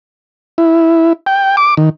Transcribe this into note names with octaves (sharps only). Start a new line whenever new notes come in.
E4
G5
D6
D#3